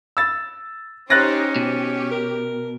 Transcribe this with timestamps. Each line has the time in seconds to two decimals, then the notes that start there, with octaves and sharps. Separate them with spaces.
0.17 E6 A6
1.10 C#4 D#4 G4 C5 F#6 A6 A#6
1.56 B2 G4
2.12 A#4